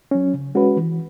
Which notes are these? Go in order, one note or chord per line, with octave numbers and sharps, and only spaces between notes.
F#3 C#4
C#3
G#3 C#4 F#4 B4
E3